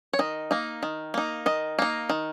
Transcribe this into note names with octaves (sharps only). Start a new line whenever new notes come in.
C#5
D#3 D#5
A#3 D#4
D#3
A#3 D#4
D#3 D#5
A#3 D#4
D#3